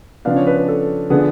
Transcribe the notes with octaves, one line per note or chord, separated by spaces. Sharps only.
C#3 F3 B3 D4 F5
C#5
B4
B4
A4
D3 F3 B3 D4 G#4